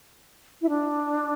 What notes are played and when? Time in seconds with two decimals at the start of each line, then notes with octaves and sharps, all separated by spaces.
0.62 E4
0.69 D4